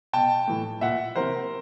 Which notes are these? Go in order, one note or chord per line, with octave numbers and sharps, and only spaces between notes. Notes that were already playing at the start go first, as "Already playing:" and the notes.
B2 G5 A5
A2 E3
A#2 E5 F#5
C3 E3 A#4 C5